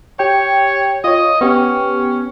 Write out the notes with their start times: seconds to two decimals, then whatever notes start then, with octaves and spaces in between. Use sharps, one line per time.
0.19 G4 C#5 G5
1.04 F4 C#5 D#5
1.41 B3 C#4 G4